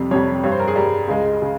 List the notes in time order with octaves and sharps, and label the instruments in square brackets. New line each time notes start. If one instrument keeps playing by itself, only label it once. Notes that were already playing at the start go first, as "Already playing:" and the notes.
Already playing: [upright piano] F2 C3 G3
F2 C3 G3 C#5
G2 G3 C#5
C5
A#4
G#4
G2 G3 A#4
C#2 C#3 G#3
C#3